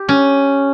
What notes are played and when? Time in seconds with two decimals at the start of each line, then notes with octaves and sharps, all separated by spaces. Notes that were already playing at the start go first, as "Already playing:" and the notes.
Already playing: G4
0.09 C#4